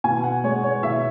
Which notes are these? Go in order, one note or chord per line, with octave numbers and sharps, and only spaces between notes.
B2 G#5
F#5
G#3 C#5
C#5
B2 E5